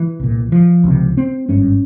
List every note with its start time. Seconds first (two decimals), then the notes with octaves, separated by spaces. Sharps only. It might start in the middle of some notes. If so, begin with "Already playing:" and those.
Already playing: E3
0.20 C2 A#2
0.52 F3
0.84 C#2 C3
1.17 C4
1.49 G#1 G2 C#4